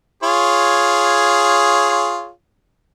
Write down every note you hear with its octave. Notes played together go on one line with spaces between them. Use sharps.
F4 G#4 C#5